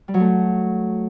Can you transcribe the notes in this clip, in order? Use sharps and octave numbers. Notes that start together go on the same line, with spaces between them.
G3
F#3
A3